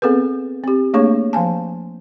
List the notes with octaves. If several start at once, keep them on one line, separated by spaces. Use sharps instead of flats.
B3 C4 G#4 A4 B4
C4 G4
A3 A#3 D4 G#4 C#5 C#6
F3 F5 G#5 A5